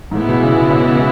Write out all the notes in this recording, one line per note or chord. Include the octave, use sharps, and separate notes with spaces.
G#2
A2 E3 G#3 B3 E4
B2
C#3
B2
C#3